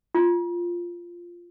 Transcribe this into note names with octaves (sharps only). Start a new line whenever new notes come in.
F4